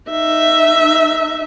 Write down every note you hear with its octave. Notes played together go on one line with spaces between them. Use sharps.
D#4 E5